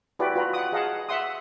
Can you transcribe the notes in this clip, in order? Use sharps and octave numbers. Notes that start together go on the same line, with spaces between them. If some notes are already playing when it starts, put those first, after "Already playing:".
E4 F#4 G4 B4 D5
F4 F#4 B4 A#5
F#5 D#6
G#4 D#5 F5 F#5 A5
E5 F#5 C6 D#6